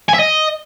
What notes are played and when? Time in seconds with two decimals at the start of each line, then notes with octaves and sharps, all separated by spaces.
0.09 G#5
0.14 E5
0.19 D#5